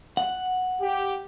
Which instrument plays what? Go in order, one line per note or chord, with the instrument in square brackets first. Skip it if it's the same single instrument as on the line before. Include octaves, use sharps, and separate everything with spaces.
[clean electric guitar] F#5
[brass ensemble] G4